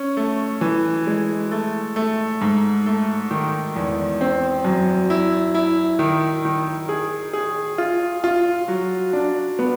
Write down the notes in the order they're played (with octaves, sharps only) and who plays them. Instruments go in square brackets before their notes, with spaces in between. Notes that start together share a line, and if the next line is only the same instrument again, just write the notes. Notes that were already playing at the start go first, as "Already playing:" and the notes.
Already playing: [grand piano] C#4
A3
E3
G#3
A3
A3
G#2
A3
D#3
E2
C4
F#2
E4
E4
D#3
D#3
G#4
G#4
F4
F4
F#3
D4
B3